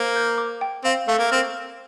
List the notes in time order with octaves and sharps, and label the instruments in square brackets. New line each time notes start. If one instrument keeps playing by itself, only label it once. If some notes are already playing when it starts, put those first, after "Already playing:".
Already playing: [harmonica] A#3 [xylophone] C5
[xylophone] G6
D6
G5
[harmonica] C4 [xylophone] F5
[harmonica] A3 [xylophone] F5
[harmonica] A#3
[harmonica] C4 [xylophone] F6